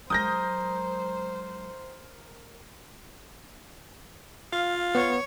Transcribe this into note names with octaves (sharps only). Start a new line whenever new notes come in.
F#3 G#3 A#4 C5 D#6 G6 A#6
F4 F5
B3 C#5